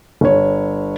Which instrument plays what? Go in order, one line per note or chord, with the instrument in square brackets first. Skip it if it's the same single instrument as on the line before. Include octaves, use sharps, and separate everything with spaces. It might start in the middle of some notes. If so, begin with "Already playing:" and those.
[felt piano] G1 C#5